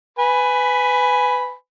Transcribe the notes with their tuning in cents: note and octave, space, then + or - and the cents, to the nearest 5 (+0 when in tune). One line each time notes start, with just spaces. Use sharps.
B4 +15 G#5 +0 B5 +0